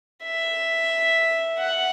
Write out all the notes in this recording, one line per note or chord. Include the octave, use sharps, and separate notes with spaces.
E5
F#5